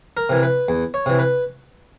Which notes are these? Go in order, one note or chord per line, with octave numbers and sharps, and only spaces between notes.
A#4
C3 E3
B4
E2
C#5
C3 E3
B4